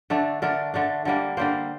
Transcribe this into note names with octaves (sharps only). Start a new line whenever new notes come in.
D3 A3 D4
D3 A3 D4 A#4
D3 A3 D4
D3 G3 A#3
D3 G3 A#3 C5